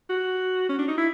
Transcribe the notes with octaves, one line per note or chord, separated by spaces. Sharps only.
F#4
C#4
D4
D#4
E4